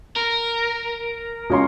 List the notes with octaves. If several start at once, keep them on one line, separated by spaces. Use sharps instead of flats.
A#4
C#2 C#4 C6